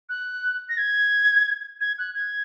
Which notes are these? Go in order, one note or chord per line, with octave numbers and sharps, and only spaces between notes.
F#6
A#6
G#6
G#6
F#6
G#6